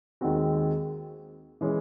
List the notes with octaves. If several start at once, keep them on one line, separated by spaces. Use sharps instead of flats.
D#2 D#3 G#3 C4 F#4
E3 G#3 C#4 G#4